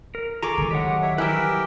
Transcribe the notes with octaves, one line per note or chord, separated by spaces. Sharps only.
A#4
G#4 A4 A#5 C#6 D6
D#3 F#3
A2 G#3 G4 F#5
C#5 E5
E3 G3 G4 A#4 B4 G5 E6